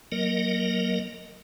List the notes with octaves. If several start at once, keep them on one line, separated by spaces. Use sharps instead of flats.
F#3 A#3 A#4 D#5